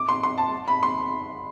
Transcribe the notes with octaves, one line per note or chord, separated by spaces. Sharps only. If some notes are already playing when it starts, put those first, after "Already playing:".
Already playing: D6
C6
C6
A5
B5
C6